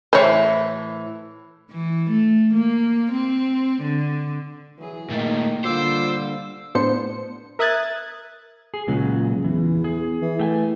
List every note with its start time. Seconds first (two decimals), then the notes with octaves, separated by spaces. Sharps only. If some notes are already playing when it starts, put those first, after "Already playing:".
0.13 A2 E3 C5 C#5
1.71 E3
2.10 A3
2.54 A#3
3.12 C4
3.82 D3
4.78 E3 F#3 G#4
5.10 A#2 D#3 A3 A#3
5.65 D3 G3 A#3 F4 C5 D6 E6
6.75 A2 B3 D4 C5 C#7
7.59 A#4 E5 D#6 F#6 G#6 A6
8.74 G#4
8.87 C#2 A#2 C#3 F#3
9.44 E2 E3
9.84 G#4
10.22 E3
10.39 A3 G5 G#5